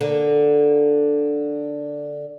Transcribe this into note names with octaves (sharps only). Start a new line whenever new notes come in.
D3 A#3